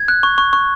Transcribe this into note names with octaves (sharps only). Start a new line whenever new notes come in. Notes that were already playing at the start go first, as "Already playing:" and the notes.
Already playing: G#6
F#6
C#6
C#6
C#6